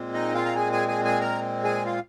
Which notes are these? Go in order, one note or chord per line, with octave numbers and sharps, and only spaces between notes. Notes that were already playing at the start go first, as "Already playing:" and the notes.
Already playing: A#2 G#3 C4
D#4 D#5
F4 F5
A#5
G#4 G#5
G#4 G#5
G#4 G#5
G#4 G#5
A#4 A#5
G#4 G#5
F4 F5